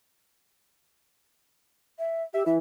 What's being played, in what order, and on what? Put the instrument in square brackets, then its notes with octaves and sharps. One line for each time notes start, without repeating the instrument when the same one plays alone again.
[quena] E5
[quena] G4 [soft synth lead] E5
[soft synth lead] E3 [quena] E5